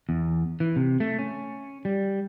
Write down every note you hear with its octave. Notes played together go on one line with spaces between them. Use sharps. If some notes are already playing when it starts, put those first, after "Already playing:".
E2
E3
C3
A3
C#4
G3